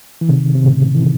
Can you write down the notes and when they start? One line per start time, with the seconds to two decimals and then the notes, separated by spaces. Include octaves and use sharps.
0.21 E3
0.29 C3 D#3
0.55 C3
0.65 A2 C#3
0.95 E3
1.02 C3 D#3